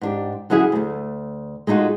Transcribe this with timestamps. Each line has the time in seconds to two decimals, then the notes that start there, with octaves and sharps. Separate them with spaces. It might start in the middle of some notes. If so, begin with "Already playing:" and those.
0.01 G#2 D4 G4
0.50 D3 F#3 C#4 E4 G#4
0.72 D2 A3
1.67 G#3 A3 D#4 F4 F#4